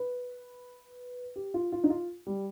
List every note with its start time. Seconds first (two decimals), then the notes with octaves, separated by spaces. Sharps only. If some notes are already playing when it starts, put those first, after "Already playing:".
Already playing: B4
1.36 G4
1.54 F4
1.72 F4
1.84 D#4
1.90 F4
2.27 G3